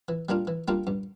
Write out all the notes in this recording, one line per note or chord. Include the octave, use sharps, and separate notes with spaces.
E3
G3 A#3 D4 F4
E3
G3 A#3 D4 F4
G2